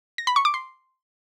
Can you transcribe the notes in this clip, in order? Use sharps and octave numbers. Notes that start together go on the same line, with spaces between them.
A#6
B5
C#6
D6
C6